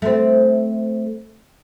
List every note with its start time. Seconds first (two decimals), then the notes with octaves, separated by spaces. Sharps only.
0.02 A3 C4